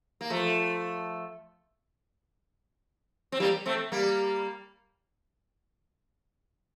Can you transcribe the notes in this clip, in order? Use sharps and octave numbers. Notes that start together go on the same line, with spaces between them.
A#3
F3 A3
C4
G3 A#3
A3 C4
G3 A#3